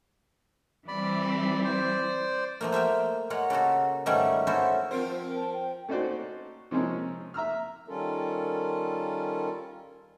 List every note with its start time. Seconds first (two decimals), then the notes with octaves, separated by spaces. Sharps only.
0.88 E3 G3 C4 D5 B5
1.65 C5 D5
2.61 F3 A3 A#3
2.72 C5 E5 F5 G5
3.30 G#3 A#3 F4 C#5 F#5
3.50 C#3 A#3 F#4 A4
4.06 G#2 D#3 G3 A3 C#4 F#5
4.47 C#4 E4 F#4 A4 C5
4.91 F3 C4 F4 A#4 C5
5.35 A5
5.53 G5
5.88 A3 C#4 D#4 F#4 C5 D5
6.71 C3 F3 G#3 C4 C#4 A#4
7.34 E5 A#5 E6 F6
7.88 D#3 G3 C#4 F4 A4 A#4